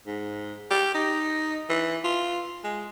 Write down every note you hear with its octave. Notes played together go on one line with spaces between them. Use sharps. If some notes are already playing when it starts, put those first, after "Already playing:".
G#2
G4
D#4
E3
F4
G#3